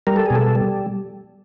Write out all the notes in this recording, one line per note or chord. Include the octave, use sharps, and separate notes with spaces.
G3 A#4
A4
B2 G#4
A4
G3